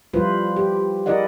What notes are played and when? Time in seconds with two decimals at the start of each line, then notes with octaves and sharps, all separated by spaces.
0.13 F3 G3 E4 F4 B4 C5
0.56 G4
1.06 E4 G#4 A#4 D5 D#5 F#5